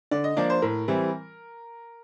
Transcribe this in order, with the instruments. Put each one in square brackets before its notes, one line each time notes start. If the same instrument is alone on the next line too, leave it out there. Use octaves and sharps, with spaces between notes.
[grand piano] D3 D5
D#5
F3 A#3 D4 D5
C5
A2 A#4
E3 G3 C4 E4